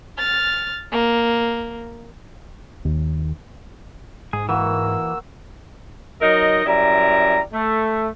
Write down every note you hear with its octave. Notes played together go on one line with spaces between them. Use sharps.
F6 A6
A#3
D#2
G#2 G#4
E3 A#3 F#4 E6
F#3 D#4 A#4 D#5
F#2 G3 E4 A#5
A3